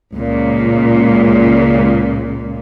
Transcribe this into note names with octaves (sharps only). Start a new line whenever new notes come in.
C#2 A#2